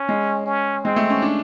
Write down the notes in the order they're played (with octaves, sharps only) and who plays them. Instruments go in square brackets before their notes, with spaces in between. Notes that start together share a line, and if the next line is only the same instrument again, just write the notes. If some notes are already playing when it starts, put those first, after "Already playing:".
Already playing: [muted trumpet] C#4
[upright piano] G#3
[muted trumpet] C#4
[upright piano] G#3 [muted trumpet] C4
[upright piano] A3
C#4
D4